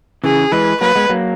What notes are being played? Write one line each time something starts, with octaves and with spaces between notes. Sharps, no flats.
C#3 E3 G#4
E3 G#3 B4
F#3 A#3 B4
G#3 B3
F#3 A#3